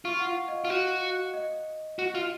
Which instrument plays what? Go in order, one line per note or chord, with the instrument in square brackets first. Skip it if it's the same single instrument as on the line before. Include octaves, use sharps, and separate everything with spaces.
[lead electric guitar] F4 [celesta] C#6
[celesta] F#5
F5
D#5
[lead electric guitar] F4
F#4
[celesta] D#5
[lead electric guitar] F#4
F4